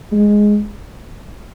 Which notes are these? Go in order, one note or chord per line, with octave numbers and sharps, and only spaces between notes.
G#3